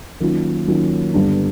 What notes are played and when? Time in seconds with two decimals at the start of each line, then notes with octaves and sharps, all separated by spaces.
0.20 D#3 F#3 A#3 C#4 F4
0.67 D#3 F#3 A#3 C#4 F4
1.14 G2 D3 G3 B3 D4